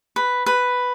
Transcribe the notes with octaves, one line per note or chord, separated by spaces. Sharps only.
B4
B4